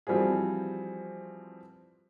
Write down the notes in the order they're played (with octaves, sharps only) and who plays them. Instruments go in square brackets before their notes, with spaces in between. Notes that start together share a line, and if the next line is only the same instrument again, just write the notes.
[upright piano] E3 F3 G3 C4 F#4 G#4